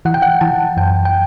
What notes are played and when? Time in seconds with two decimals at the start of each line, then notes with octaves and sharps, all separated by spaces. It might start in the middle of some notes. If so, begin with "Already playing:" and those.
0.05 E3 F#5
0.14 G5
0.22 F#5
0.41 E3 A5
0.77 F#2 G5
1.05 G5